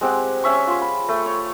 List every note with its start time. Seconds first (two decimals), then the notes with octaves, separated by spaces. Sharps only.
0.01 G#3 C4 G4 F#5
0.44 C#4 E5 C#6
0.67 F4 C6
0.82 B5
1.09 A3
1.26 C#5